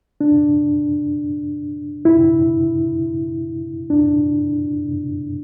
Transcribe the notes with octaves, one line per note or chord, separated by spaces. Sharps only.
D4
E4
D4